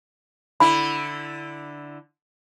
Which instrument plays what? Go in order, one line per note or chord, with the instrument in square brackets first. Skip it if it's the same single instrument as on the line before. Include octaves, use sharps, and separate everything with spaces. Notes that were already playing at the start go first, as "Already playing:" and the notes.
[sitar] D3 E4 [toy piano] B5